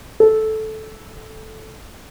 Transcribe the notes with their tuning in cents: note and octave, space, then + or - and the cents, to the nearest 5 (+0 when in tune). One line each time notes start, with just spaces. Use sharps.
A4 -10